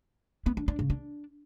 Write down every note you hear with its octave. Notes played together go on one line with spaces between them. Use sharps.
B3
D4
D4
C#3
D4